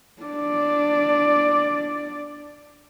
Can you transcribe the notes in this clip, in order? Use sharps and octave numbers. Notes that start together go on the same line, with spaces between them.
D4 D5